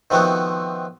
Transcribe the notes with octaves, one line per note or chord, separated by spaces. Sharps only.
D#3 F3 A3 B3 C4 F#4